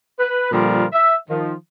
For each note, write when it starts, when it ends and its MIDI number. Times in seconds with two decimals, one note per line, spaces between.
0.18 0.52 71
0.52 0.84 46
0.52 0.84 50
0.52 0.84 53
0.52 0.84 55
0.52 0.84 65
0.52 0.84 70
0.93 1.15 76
1.29 1.53 51
1.29 1.53 53